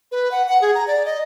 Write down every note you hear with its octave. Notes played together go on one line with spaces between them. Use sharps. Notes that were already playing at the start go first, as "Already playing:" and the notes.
B4
F#5
F#5
G#4
A#5
D5
D#5